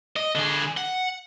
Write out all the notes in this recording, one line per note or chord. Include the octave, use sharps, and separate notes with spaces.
D#5
D3 G#4
F#5